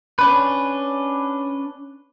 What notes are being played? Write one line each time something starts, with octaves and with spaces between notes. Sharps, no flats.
C#4 D4 B4